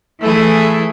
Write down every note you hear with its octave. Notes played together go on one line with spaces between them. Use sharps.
E3 A3 E4 G#4